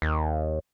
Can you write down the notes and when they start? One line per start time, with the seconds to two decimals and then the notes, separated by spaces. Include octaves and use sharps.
0.02 D#2